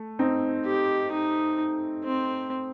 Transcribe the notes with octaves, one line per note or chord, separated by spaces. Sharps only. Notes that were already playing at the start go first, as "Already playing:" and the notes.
Already playing: A3
C4 D#4
G4
D#4
C4